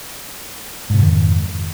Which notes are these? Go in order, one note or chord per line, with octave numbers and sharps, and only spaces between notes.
F2 G#2 C3 D#3